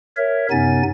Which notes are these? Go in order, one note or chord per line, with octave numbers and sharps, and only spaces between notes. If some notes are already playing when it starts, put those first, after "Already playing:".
A#4 C#5 E5
F#2 C3 B3 D#4 G#5 A6